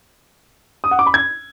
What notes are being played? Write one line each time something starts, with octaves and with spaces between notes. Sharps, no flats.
D#6
F#5
D6
B5
G#6